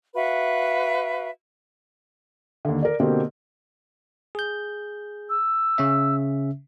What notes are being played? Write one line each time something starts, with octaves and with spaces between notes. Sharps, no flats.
F#4 B4 E5 F5
D#2 D3
A#4 D5
B2 D3 A#3 C4 G4
G#4 G6
E6
C#3 C#4 E5